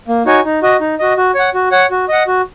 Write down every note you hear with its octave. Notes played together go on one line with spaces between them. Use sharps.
A#3
D#4 F#4 C#5 G#5
D#4
F#4 D#5
D#4
F#4 D#5
F#4
C#5 F#5
F#4
C#5 F#5
F#4
D#5 F#5
F#4